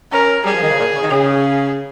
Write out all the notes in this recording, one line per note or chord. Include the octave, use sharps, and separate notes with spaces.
C#4 A#4
G3 G#4
F3
D#3
C#3
A#2
C#3
D#3
C#3 G#4